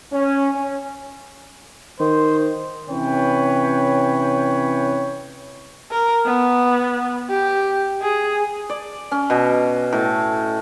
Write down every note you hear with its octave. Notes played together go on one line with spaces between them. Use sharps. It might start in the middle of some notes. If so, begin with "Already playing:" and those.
C#4
C#4
D#3 C5
C3 E3 C#4 B4 C#5 G5
A#4
B3
G4
G#4
D5
C#4
B2
A2